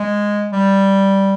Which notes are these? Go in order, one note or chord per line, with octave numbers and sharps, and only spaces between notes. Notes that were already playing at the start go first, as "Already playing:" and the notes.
Already playing: G#3
G3